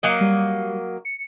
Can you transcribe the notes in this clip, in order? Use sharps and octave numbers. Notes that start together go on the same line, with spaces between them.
F#3 A#3 D#5
G3
C#7